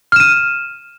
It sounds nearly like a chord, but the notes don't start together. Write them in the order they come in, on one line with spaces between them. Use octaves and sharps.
F6 E7 D#7